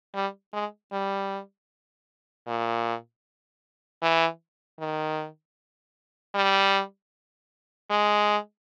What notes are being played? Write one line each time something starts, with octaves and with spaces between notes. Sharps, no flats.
G3
G#3
G3
A#2
E3
D#3
G3
G#3